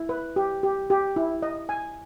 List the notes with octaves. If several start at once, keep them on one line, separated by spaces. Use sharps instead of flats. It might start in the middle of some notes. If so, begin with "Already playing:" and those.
Already playing: E4
B4
G4
G4
G4
E4
D#5
G#5